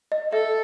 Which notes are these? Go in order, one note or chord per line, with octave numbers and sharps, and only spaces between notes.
D#5
A4 E5